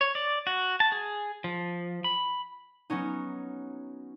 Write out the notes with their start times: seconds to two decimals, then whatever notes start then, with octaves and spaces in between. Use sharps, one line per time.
0.01 C#5
0.15 D5
0.47 F#4
0.80 A5
0.92 G#4
1.44 F3
2.04 B5
2.90 F#3 B3 C#4 D#4